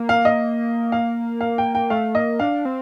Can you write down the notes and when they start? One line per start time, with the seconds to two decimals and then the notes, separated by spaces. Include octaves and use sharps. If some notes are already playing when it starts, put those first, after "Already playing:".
Already playing: A#3
0.09 F5
0.25 D#5
0.92 F5
1.41 F5
1.58 G5
1.75 G5
1.90 A3 F5
2.15 A#3 D#5
2.39 D4 F5
2.65 C4